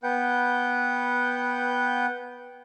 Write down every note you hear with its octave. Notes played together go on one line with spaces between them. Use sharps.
B3 B4 F#5 G5 G6